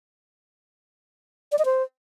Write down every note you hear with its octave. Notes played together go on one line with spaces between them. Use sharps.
D5
D#5
C5